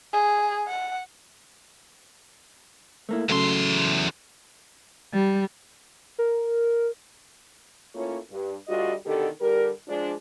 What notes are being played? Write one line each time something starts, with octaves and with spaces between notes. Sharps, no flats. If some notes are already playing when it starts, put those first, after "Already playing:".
G#4
F#5
A3 A#3 E4
E2 C#3 F#3 A3 C6
G3
A#4
A2 A#3 C#4 F4 C#5
G2
D2 G3 F4 F#4 D#5
B2 D3 D#3 G4 A4
D3 G3 G4 A#4
F3 G#3 D4